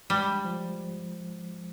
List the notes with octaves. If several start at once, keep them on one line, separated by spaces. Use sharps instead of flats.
G3 G#3
F3